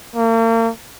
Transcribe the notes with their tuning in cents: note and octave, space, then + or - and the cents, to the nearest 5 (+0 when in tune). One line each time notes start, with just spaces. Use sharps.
A#3 -40